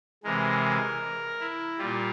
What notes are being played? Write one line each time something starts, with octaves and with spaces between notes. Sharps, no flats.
C3 E3 G#3 A#4
E4
A#2 G3 F4